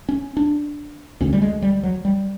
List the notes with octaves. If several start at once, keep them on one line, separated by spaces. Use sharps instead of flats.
C#4
D4
D2 D3 C#4
G3
G#3
G3
F#3
G3